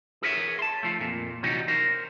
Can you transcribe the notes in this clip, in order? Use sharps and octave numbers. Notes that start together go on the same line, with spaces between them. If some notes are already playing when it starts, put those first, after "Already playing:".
G#4 A#4 B4 C#5 E5
A5 C6
F3 A3
F2 A#2
C3 E3 F#3 G3 B3 D#4
A#4 C5